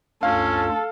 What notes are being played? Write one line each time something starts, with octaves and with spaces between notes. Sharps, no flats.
D2 G2 C#4 F4 A4 F5